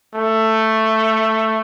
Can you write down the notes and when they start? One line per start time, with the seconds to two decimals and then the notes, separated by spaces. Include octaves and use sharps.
0.15 A3